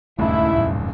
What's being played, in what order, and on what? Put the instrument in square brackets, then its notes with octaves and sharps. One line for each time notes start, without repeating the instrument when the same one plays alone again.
[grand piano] D#1 C#2 G2 [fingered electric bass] A3 [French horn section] E4
[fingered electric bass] F#2 A2